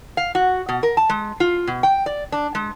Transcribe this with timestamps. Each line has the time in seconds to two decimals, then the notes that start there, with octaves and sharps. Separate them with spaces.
0.17 F5
0.35 F#4
0.69 B2
0.83 A#4
0.97 A5
1.10 G#3
1.40 F4
1.67 B2
1.83 G5
2.06 D5
2.32 D4
2.55 G#3